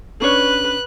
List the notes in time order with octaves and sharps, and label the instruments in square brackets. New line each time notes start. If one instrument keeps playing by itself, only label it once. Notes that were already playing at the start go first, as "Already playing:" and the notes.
[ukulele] C#4 D4 C#5 [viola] B4 [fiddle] F#6